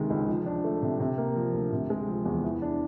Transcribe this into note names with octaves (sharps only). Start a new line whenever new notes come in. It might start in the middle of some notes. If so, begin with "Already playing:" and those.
Already playing: D2 C3 D#3 G#3
C#2
F3
D4
A3
C3
C3
A#3
F3
D2
C3
G#3
F3
E2
E3
D4